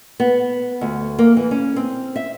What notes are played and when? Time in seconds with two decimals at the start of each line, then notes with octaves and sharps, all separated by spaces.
0.20 B3
0.81 D2
1.19 A#3
1.37 E3
1.51 C#4
1.76 C4
2.16 E5